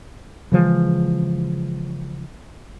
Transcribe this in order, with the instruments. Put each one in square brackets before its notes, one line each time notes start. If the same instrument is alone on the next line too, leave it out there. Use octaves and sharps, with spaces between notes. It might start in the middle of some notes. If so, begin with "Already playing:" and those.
[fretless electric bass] C#3 E3 F3 G#3